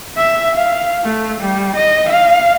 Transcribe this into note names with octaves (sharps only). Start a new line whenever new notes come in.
E5
F5
A3
G3
D#5
F5